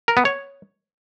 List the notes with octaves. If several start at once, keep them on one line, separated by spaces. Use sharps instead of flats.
A#4
B3
C#5